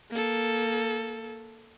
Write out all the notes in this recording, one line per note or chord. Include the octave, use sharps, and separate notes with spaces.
A#3 A4